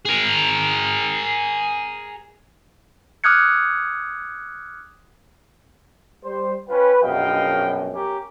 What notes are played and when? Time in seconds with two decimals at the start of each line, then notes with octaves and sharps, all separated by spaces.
0.06 G#4 A#4
3.24 D6 D#6 F6 F#6 G#6 C#7
6.23 G3 C5
6.69 C#4 F4 B4 G5
7.03 A#1 F#2 B2 D#5 F5 G5
7.94 C#4 G4 A#4